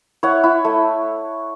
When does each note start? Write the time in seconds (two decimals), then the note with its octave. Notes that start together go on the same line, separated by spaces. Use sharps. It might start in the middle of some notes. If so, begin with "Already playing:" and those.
0.23 E4 C#5 F#5
0.44 E4
0.65 A3